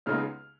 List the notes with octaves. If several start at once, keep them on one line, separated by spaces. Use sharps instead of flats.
C#2 C#3 G#3 B3 D#4 F6